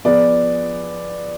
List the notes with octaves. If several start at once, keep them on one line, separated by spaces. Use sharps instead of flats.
F3 B3 F4 G#4 D5